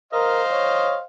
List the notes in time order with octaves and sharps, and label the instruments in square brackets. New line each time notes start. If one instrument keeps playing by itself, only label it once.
[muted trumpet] A#4 [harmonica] C5 D#5 F5
[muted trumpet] C#5